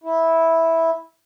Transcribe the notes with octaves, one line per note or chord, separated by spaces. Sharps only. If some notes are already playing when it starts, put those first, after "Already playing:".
E4